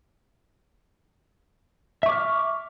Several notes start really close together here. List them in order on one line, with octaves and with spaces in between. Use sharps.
E5 C#6 D6 F6